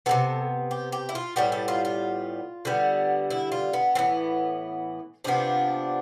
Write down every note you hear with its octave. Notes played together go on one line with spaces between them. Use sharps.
C3 G3 B3 A4
G4
G4
E4
F4
A2 G3 B3 G4
A4
F4
F4
D3 G3 B3
E4
F4
B3
A2 E3 B3 C4
C3 F3 B3 D4